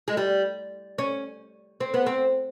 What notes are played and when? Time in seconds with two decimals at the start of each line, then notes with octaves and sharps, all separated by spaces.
0.08 G#3
0.17 G3
0.98 C#4
1.80 C4
1.94 B3
2.06 C4